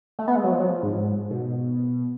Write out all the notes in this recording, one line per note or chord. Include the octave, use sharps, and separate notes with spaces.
A3
B3
G#3
F#3
F3
F#3
F3
G#2
B2